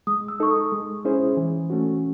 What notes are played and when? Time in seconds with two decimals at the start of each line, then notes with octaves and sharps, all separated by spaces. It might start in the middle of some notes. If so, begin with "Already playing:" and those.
0.07 G#3 D#6
0.28 E6
0.40 D#4 A4 C#6
0.50 D#6
0.72 G#3
1.05 C#4 E4 G#4 C5
1.37 E3
1.70 A3 C#4 F#4